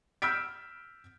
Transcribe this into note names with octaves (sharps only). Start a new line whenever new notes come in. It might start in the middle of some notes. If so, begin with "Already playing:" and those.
E6 F6 G6 B6 D7